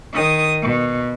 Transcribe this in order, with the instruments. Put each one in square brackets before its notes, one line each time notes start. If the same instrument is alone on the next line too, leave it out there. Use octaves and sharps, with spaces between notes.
[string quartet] D#3 D#6
B2